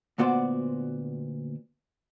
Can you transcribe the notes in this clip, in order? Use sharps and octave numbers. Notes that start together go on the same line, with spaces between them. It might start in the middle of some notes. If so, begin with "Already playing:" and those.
D2 A#2 B3 F#4 C5 D5